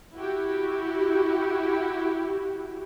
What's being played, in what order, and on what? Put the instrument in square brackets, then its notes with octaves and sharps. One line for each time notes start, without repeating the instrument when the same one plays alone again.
[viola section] E4 F#4 G4